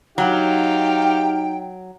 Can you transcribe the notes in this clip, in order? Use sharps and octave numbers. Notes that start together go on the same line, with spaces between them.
F#3 D#4 G4 F5 G5